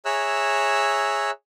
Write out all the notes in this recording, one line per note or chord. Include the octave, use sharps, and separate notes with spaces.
G#4 C#5 E5 A#5 E6 F#6